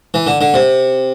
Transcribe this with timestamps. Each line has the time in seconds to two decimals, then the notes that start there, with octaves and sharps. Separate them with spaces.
0.14 E3
0.27 D3
0.41 D3
0.54 C3